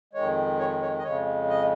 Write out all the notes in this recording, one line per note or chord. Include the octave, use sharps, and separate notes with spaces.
F2 D#3 G#3 C#5
C#5
C#5
D#5
F2 C#3 G#3 C#5
D#5